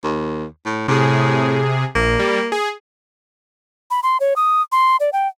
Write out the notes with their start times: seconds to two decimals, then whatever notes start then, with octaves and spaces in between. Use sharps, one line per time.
0.04 D#2
0.65 A2
0.88 A2 C3 G#4
1.95 A#1 A#3
2.19 G3
2.52 G#4
3.91 B5
4.03 C6
4.20 C#5
4.36 D#6
4.72 C6
5.00 D5
5.13 G5